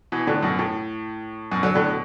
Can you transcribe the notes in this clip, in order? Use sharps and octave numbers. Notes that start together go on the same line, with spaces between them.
B2 E3
A2 D3
F#2 B2
A2
F#2 B2
D3 F#3
A2 D3
B2